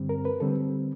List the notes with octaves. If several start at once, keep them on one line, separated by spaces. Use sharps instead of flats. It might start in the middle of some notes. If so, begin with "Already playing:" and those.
Already playing: G2 D3 G3 C4
A#4
B4
D3 G3 C4 A4